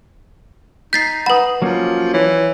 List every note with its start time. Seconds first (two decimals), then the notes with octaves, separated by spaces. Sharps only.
0.93 D#4 G6 A6 B6 C7
1.26 B4 F#5 B5 D#6
1.62 F3 F#3 A#3 C#4
2.14 E3 C#5